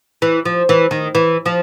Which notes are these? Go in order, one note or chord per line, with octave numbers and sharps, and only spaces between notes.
E3
F3
E3
D#3
E3
F3